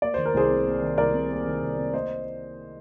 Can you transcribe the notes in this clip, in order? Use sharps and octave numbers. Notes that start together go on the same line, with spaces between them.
A#3 D5
D#3 C5
A#4
C2 G#4 C5
C3
A#3
D#3
C2 A#4 D5
C3
A#3
D#3
C2
C3
A#3 C5 D#5